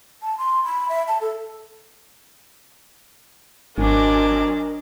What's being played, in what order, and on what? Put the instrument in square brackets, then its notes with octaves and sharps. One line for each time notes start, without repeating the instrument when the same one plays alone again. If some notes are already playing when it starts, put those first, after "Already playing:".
[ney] A5
C6
B5
E5
A5
A4
[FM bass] G#1 [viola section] F#3 C4 G#5 [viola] D4 D5 [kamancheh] A#4 D#5